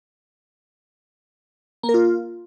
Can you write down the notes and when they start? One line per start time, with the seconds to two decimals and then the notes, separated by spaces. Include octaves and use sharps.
1.83 A#3
1.89 A#4
1.94 F4